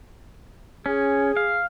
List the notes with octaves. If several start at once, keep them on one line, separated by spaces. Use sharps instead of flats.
C#4 G#4
F5